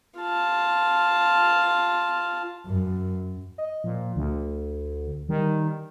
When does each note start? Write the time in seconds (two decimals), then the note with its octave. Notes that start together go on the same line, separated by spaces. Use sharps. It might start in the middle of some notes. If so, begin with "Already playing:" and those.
0.19 F4 A5
2.66 F#2
3.58 D#5
3.84 A#2 F3
4.16 D2 D3
5.29 D#3 G3